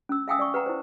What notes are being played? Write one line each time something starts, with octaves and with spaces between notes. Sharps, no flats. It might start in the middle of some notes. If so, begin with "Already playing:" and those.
C#4 E6
E5 F5 G5 G#5 D#6 E6
D5 C#6
B4 F#5 G5 A#5
E4 C5